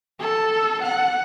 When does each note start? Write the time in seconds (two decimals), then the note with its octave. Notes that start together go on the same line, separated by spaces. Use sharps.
0.20 A4
0.82 F#5